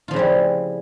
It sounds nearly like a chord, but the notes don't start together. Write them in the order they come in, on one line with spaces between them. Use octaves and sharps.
F4 F3 C#3 E4 G3